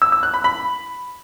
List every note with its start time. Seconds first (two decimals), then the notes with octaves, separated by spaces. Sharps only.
0.02 E6
0.12 E6
0.23 F#6
0.34 B5
0.44 B5